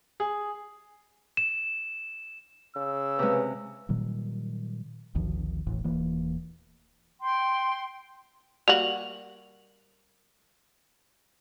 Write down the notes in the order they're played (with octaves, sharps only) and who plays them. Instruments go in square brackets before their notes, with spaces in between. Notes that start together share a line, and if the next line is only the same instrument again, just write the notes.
[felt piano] G#4
[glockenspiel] E7
[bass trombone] C#3 [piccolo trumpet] E6
[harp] C3 G#3 [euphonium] B4
[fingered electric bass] A#2 D#3 F#3 G3
G#1 D2 D#3 F3
E1 A1 A2 E3
D#1 E3 A#3
[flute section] G5 C6
[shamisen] G3 A#3 F#4 [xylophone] F7 F#7